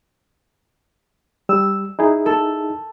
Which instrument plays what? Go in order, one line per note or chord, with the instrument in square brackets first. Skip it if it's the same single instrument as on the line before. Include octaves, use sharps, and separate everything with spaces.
[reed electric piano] G3 [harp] E6
[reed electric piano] D#4 E4 G#4
[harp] A4